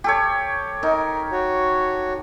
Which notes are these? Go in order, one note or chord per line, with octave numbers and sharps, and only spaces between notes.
G4 A4 C#5
D#4 A#4
F#4 C#5